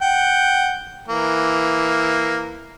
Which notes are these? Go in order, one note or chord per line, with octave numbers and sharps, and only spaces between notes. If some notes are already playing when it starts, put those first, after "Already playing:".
F#5 G5
E3 A#3